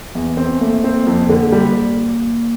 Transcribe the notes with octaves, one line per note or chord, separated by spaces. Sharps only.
E2
C4
A3 A#3
C4
F2
D3
G3